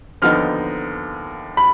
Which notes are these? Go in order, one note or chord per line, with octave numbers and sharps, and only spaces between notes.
D#2 D3 F3 B3 D#4 F6
B5